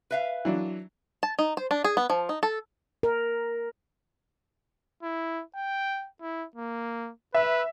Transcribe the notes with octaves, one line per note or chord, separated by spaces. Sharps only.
B4 E5 F5
E3 F#3 D4
A5
D#4
C5
D4
G#4
B3
F3
D#4
A4
A#4
E4
G5
E4
A#3
B4 E5